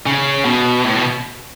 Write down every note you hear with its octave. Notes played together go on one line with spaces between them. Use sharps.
C#3
B2
A2
B2